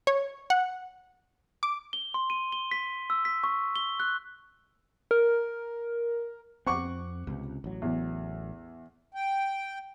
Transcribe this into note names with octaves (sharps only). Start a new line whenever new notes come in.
C#5
F#5
D6
G7
C6
D#7
G7
B6
E6
B6
C#6
G7
F#6
A#4
F2 C4 F#5 C#6 D6
C#2 C3
A1 F#3
E2
G5